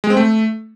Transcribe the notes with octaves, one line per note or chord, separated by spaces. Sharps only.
G#3
C4
A3